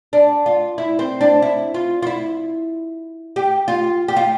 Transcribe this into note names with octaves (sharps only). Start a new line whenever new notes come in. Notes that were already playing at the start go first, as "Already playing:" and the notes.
D4
F4
E4
C4
D4
E4
F4
F4
E4
G4
F4
G4
F4